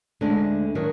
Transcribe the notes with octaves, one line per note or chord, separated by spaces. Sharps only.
D2 D3 G#3 D4
D#3 F#3 D4